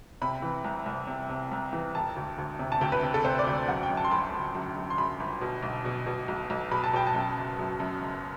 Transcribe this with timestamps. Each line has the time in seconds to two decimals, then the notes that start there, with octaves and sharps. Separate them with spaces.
0.22 C3 B5
0.42 E3
0.64 C2
0.86 C2
1.07 C3
1.29 C3
1.51 C2
1.73 E3
1.95 E1 A5
2.16 D2
2.38 D2
2.59 C3
2.72 A5
2.81 D2 G5
2.92 B4
3.03 C3
3.14 A4
3.25 C3 C5
3.39 D5
3.47 D2
3.68 F#2 F#5
3.83 G5
3.90 F#2
3.97 A5
4.04 C6
4.11 G1 B5
4.34 G1
4.55 F#2
4.76 F#2
4.90 C6
4.98 F#2 B5
5.20 G1
5.41 B2
5.63 B1
5.85 B2
6.06 B2
6.28 B1
6.50 B1
6.71 B2 B5
6.84 A5
6.93 B2 G5
7.07 A5
7.15 F#2
7.37 F#1
7.59 F#2
7.80 F#2
8.02 F#1